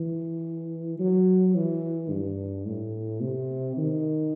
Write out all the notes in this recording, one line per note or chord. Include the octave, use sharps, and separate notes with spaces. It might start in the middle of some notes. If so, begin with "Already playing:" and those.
Already playing: E3
F#3
E3
G2
A2
C3
D#3